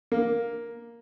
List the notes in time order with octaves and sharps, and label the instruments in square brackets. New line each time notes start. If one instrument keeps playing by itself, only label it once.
[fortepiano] A#3